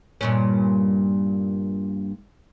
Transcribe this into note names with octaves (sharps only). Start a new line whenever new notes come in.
G2 A#2 C#4